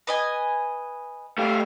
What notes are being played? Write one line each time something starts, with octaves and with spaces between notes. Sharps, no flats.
B4 D#5 G#5
A3 G4 F5